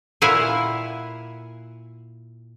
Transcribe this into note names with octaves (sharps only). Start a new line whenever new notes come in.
A#2 E4 F5 F#5 G#5